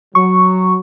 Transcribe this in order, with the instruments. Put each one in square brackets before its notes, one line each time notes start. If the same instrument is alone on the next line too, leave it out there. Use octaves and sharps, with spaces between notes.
[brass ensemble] F#3 [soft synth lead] C#6